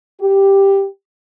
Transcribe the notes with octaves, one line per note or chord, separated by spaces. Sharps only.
G4